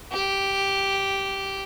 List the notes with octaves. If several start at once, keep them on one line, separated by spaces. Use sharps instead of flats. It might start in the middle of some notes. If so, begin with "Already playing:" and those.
G4